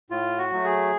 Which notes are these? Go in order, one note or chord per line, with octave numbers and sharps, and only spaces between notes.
A2 F4
F#4
F#3 A3
G#4